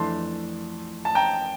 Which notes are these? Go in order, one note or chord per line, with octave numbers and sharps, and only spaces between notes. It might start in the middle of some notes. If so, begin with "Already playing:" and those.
Already playing: F2 E3 A3 D4 A5 C6
A5
G5 A#5